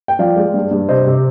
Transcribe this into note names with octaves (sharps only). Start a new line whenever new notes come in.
G5
F3 D5 F5
G#3
G2
G2
C3 C5 D#5
C3